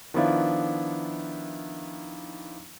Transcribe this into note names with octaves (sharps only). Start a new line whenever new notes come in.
D#3 F3 B3 D4 E4 F4